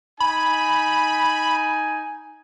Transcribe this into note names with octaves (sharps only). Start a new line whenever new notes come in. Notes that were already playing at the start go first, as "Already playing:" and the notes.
D#4 G#5 B5